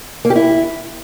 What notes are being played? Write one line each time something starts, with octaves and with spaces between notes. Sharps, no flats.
A#3
G4
E4